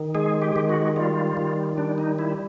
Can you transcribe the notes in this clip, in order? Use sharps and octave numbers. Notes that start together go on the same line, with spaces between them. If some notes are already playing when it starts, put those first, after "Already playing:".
Already playing: D#3
G#3 G#4
G4
D#3
F#4
G3 F4
D#3
G3 D4
D#4
G3 E4